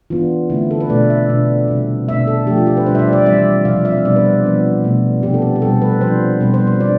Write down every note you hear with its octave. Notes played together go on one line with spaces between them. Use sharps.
E3 B3 D4 F4
D3 A3 C4 E4
A4
B4
B2 A3 D4 D5
E5
B2 B3 D4
C3 G3 C4
B2 A3 D4 E5
A4
F3 A3 D4 G4
F4
G4
B4
B2 G3 D4 C5
E5
D5
D5
E3 G3 C4 E5
C3 F3 C4 F5
E5
B2 G3 B3 D4 D5
B4
C5
F3 B3 D4
B2 A3 D4
C3 F3 B3 D4 G4
A4
G4
G4
B2 G3 C4 A4
B4
F3 B3 D4 C5
B2 G3 C4 B4
C5
C5
B3 D4 D5